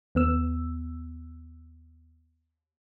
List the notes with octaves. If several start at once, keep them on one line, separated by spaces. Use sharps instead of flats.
D#2 B3 E6